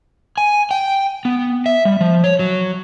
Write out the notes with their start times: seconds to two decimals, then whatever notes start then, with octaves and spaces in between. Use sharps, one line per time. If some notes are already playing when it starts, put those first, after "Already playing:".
0.38 G#5
0.71 G5
1.25 B3
1.66 E5
1.85 G3
2.01 F3
2.24 C#5
2.39 F#3